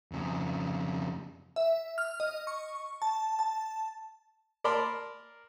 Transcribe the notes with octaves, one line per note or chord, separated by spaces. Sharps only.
F2 C#3
E5
F6
D#5
C#6
A5
A5
A#4 D5 A5 B5 C6